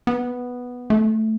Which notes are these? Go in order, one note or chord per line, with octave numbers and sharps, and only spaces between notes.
B3
A3